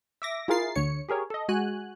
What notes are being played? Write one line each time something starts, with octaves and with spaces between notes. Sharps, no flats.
E5 D6 A#6
E4 F4 G#4 A#4 A6 C7
D2 D3 C#5 C#7
G4 G#4 A#4 C#5
A4 D#5
G#3 F#4 G#5 F#6